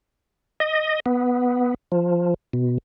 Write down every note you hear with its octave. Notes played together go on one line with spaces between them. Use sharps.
D#5
B3
F3
B2